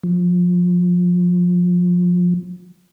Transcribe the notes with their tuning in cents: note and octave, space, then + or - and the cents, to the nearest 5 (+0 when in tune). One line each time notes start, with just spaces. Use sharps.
F3 +25